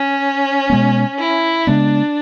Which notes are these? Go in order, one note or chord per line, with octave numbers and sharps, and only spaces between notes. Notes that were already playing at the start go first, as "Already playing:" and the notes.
Already playing: C#4
B2 G#3 B3
E4
C#3 G#3 B3 D4